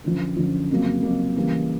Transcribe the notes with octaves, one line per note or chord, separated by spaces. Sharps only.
F#2 D3 F3
F#2 D3 F3
F2 C#3 F#3 A#3
F2 C#3 F#3 A#3
C#3 E3 G3 A#3